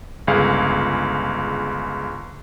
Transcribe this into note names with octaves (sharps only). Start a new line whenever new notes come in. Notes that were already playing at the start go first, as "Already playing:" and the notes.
G1 C#2 G#4 F5